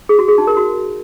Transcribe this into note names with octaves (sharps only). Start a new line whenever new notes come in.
G#4
F#4
G#4
D#4
A#4
F#4